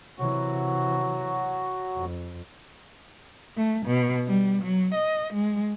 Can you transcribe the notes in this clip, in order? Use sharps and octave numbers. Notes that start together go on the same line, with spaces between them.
C3 E3 F#3 F#4
F2
A3
B2
G3
F#3
D#5
G#3